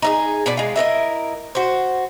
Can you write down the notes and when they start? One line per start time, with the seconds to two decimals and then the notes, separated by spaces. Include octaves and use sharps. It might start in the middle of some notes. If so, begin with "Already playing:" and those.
0.02 D#4 E4 G#4
0.46 B2 B4 D5
0.57 G#3 F4
0.76 E4 A#4 B4 D#5
1.55 F#4 C5